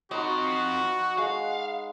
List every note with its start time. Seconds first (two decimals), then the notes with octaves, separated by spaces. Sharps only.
0.11 F3 C4 D#4 F#4 B4 D#5
1.18 G#3 F5 F#5